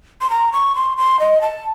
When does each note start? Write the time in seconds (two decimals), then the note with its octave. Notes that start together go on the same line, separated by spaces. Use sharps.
0.21 C6
0.30 A#5
0.52 C#6
0.75 C6
0.97 C6
1.20 D#5
1.42 A5